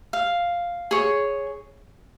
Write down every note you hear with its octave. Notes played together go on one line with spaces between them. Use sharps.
F5
G#4 C#5